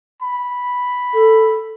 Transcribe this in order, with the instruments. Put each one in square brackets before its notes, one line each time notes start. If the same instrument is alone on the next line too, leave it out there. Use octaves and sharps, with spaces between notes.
[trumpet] B5
[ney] A4